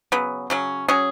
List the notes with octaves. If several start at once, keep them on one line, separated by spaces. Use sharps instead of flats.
C#3 F#3 B3
C#3 F#3 C#4
F#3 C#4 G#4